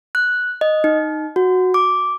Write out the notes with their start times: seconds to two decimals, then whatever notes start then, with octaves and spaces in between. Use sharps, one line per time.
0.15 F#6
0.61 D#5
0.84 D#4
1.36 F#4
1.74 D6